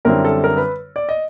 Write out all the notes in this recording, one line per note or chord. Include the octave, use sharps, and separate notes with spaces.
F#2 D3 G3 C4 E4 A#4
A4
A#4
B4
D5
D#5